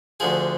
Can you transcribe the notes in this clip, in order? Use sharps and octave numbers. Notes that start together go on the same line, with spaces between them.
D2 D3 F3 G#4